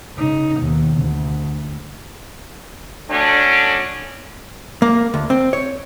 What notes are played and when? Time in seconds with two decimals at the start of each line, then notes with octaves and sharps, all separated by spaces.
0.16 C#3 D#4
0.58 D#2 B2
0.95 D2
3.10 F#3 A3 C#4 D4
4.82 A#3
5.14 D2
5.30 C4
5.53 C#5